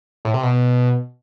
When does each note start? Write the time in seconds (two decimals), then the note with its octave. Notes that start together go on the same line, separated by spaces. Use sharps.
0.25 A2
0.34 C3
0.43 B2